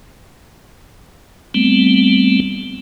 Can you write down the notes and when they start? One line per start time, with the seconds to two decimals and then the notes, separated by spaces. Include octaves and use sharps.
1.54 G3 A3 B3 C4